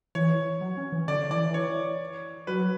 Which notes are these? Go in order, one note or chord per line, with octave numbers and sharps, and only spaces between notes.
E3 C#5
F#3
C#4
E3
D3 D5
E3 D5
C#5
F#3 B4